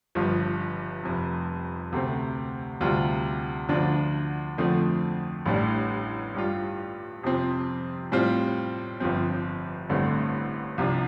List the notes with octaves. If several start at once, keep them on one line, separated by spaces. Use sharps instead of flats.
G1 G2 F3
F1 F2 C3
D2 C3 A3 C4
D2 C3 G3 F4
D2 D3 F3 D4 F4
F2 D3 F3 A3 C4
A1 A2 G3 D4
G2 G3 F4
F2 C3 F3 C4
A2 G3 C4 F4
G1 G2 F3 C4
A1 G2 D3 A3 C4
C2 C3 F3 D4